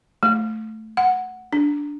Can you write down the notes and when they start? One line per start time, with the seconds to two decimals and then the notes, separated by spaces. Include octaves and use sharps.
0.23 A3
0.97 F#5
1.53 D4